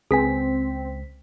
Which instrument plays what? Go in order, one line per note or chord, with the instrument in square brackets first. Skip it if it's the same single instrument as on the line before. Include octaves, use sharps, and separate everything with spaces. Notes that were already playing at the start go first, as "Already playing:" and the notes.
[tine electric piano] C#2 B6 [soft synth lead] C4 [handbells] G#4 B4 G#5